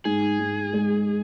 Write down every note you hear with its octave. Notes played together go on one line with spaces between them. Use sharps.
G#2 G#4
G#2
G#3